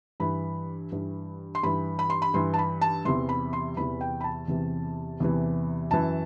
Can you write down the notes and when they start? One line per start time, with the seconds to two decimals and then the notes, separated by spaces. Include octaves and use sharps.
0.20 G2 E3 B5
0.92 G2 E3
1.55 C6
1.63 G2 E3 B5
1.99 B5
2.10 C6
2.22 B5
2.34 G2 E3 C6
2.54 A5
2.59 B5
2.81 A5
3.05 E2 C3 E3 C6
3.29 B5
3.53 C6
3.77 E2 C3 E3 B5
4.01 G5
4.21 B5
4.24 A5
4.48 E2 C3 E3
5.20 E2 C3 E3
5.91 F#2 E3 A5